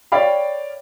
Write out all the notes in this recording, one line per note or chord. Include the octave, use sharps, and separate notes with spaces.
C#5 D5 F5 G5 B5